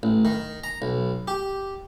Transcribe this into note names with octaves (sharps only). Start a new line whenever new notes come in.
A1
D#3
A#5
B1
G4